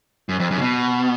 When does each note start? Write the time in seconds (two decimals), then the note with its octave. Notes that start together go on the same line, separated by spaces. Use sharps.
0.29 F#2
0.40 F2
0.51 F#2
0.57 C#3
0.61 B2